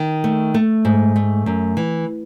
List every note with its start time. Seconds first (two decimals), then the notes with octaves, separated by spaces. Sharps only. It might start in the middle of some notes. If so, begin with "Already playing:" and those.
Already playing: D#3
0.24 A3
0.54 A3
0.85 G#2
1.16 A3
1.46 F#2
1.77 E3